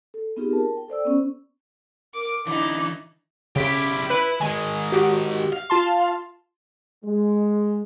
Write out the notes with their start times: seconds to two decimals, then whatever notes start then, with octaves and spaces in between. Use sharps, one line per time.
0.14 A4
0.36 B3 C4 D#4 F4 G4 G#4
0.51 A#4 A5
0.77 G5
0.88 A4 C5 D5 E6
1.05 B3 C#4
2.14 A#4 D6
2.47 D3 E3 D#4 E4 D6
3.56 C#3 E4 G4 B6 D7
4.10 E4 B4
4.41 D#3 G#3 G#5
4.92 F#4 G4
5.53 F5
5.70 F4 A5 C6
7.05 G#3